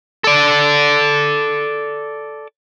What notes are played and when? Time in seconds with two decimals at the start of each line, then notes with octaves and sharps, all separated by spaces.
0.24 A4 D5